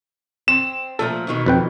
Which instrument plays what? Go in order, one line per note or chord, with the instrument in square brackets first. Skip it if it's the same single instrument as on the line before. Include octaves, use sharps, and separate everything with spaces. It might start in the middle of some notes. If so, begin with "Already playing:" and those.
[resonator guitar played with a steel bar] C4 [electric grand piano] E7
[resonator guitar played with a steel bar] A#2 F3 A3 [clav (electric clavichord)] A4
[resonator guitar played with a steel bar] B2 D#3 E3
[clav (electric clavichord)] F2 B4 G5